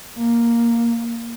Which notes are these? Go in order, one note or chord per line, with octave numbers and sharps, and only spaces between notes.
A#3